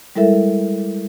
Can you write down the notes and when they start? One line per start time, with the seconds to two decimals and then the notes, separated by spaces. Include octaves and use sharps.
0.16 G3 G#3 E4 A4 A#4 E5